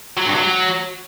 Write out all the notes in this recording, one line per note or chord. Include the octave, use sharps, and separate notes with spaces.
F#3
G2
F#3